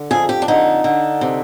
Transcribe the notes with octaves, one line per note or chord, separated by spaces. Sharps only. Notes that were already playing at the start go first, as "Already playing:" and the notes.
Already playing: D3
F2 G#4
G4
D4
D3 D#4
D3
C3